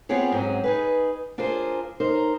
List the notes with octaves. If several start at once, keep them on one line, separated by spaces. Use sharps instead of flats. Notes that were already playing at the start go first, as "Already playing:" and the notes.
B3 C4 F4 G4 G#4 C#5
G#2 F#3 C4 C#4 G#4
D#4 G#4 B4
D4 F4 G#4 A#4 C5
D#4 A#4 C5